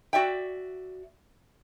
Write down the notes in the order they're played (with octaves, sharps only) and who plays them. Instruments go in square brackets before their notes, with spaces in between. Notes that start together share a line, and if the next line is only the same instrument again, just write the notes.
[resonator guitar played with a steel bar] F#4 D5 E5 G5